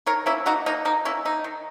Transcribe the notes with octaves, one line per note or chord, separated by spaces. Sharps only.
D#3 A#4 C#5
A#3 C#4 E4
A#3 D#4 F#4
A#3 D#4
A#3 D#4
A#3 C#4 E4
A#3 D#4
D#3